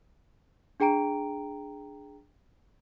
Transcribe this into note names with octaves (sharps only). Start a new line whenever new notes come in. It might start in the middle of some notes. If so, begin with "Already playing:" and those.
D4 G#4 G5 A#5 D7